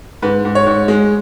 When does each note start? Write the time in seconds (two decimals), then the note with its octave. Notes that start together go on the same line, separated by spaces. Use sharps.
0.22 G#2 B4
0.45 G#2
0.55 C#5
0.66 G#2
0.88 G#3